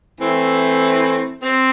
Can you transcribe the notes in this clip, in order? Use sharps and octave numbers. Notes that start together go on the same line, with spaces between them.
E3 A3 C4
C4